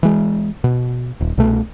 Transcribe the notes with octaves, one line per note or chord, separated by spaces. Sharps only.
E3 G#3
B2
D#1
C2 B2 A3